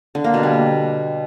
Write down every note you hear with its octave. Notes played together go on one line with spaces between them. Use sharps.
D3
A#3
B2
G3